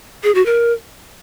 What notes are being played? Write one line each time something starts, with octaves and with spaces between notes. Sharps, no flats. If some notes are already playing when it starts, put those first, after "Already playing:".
G#4
F#4
A#4